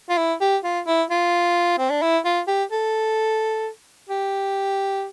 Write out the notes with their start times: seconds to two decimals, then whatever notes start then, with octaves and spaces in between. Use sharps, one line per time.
0.09 F4
0.18 E4
0.41 G4
0.64 F4
0.87 E4
1.10 F4
1.78 C4
1.90 D4
2.02 E4
2.25 F4
2.48 G4
2.72 A4
4.09 G4